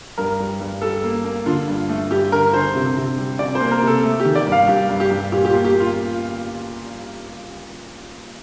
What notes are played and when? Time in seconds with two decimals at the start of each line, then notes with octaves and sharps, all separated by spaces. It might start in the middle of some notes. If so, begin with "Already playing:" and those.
0.18 G2 A#4
0.40 G3
0.60 G2
0.82 G3 A4
1.04 A#3
1.25 A#3
1.46 D3 F4
1.68 G2
1.89 A3
2.11 G2 G4
2.32 D3 A#4
2.53 D3 C5
2.75 C3
2.97 C3
3.18 G3
3.39 C3 D5
3.55 C5
3.61 A#3
3.71 A#4
3.82 C3
3.87 A4
4.04 A3
4.20 G4
4.25 D#3
4.35 D5
4.47 G2
4.52 F5
4.68 G2 G4
4.89 G2
5.00 G4
5.11 G2
5.32 A#2 G4
5.45 G4
5.48 F4
5.53 A#3
5.65 G4
5.75 A#3
5.80 F4